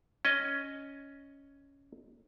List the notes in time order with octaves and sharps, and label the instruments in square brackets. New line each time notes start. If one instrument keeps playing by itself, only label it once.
[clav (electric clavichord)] C#4 D#5